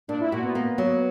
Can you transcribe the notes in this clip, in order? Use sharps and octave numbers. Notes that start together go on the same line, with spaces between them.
A#2 D4
E4
A#2 F#4
B3
A#3
F#3